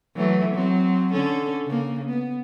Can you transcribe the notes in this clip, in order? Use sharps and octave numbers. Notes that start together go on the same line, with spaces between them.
E3 F#3 A3
F#3 C4
D3 C#4 A4
C#3 A#3
B3